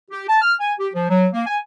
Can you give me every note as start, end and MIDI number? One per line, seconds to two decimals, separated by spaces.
0.11 0.24 67
0.29 0.42 81
0.42 0.54 89
0.61 0.73 80
0.79 0.89 67
0.94 1.06 53
1.10 1.27 54
1.34 1.43 58
1.46 1.58 80